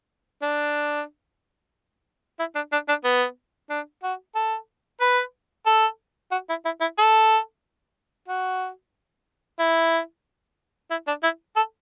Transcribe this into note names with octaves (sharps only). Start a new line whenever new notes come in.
D4
E4
D4
D4
D4
B3
D4
F#4
A4
B4
A4
F#4
E4
E4
E4
A4
F#4
E4
E4
D4
E4
A4